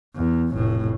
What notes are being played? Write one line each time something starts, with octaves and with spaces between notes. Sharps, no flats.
E2
F1 A2